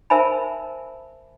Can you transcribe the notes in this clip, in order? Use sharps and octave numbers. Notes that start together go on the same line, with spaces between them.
A#4 C5 E5 G#5 A5 B5